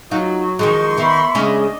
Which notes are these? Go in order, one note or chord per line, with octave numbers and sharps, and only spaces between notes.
F#3 D#4 F4 F#4
D#3 F3 G#3 D#5 C6 C#6
D#3 B3 E5 B5
C#3 G#3 C#4 D4 D#5